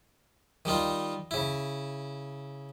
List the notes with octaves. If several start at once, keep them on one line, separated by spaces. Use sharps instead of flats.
D#3 G3 D#4 F4
C#3 E4